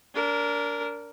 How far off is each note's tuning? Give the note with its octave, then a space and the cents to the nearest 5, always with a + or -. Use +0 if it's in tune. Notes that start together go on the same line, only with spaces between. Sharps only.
D4 -30 A#4 +0